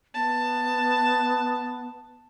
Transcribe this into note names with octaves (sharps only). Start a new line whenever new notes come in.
B3 A5